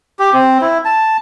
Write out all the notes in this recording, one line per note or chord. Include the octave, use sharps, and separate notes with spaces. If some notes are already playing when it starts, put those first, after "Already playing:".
G4
C4
E4
A5